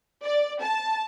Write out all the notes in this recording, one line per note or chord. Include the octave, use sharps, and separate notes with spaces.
D5
A5